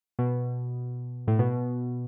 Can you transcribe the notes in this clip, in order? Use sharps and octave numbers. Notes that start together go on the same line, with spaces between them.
B2
A2
B2